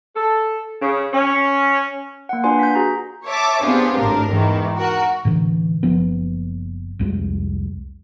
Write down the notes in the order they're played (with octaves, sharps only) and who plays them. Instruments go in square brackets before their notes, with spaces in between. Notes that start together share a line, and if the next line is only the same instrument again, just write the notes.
[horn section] A4
C#3
C#4
[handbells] A#3 F#5
D4 F4 B4 D5 G#5 C6
G6 B6
F#4 G#4 A#5
[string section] C#5 E5 A5 D6
B3 C4 D4 F4 G4 G#4
G#1 A2 D4 A#4
E2 G#2 D#3 E3
F#4 A#4
[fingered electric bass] A2 D3 E3
F#1 F3 B3
C2 F2 G3 G#3